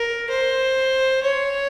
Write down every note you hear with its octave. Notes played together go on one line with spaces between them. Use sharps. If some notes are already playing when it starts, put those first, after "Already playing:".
Already playing: A#4
C5
C#5